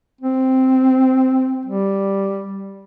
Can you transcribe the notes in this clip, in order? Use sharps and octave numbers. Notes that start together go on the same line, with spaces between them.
C4
G3